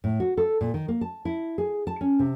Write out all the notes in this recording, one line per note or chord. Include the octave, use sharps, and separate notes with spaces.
A2
F#4
A4
A#2
D#3
A#3
A5
E4
G#4
A5
C#4
C3